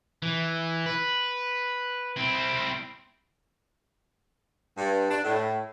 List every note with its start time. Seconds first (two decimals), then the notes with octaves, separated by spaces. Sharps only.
0.23 E3
0.86 B4
2.17 C4 E4
4.77 G2
5.09 D4
5.24 A2